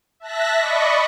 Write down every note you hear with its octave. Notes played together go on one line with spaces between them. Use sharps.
E5 A5 F#6 A#6 B6
D5 D#5 B5 C#6